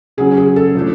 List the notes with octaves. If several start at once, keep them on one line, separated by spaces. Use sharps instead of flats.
C#3 F#3 C#4 G#4
G#4
A4
F3 A3 D4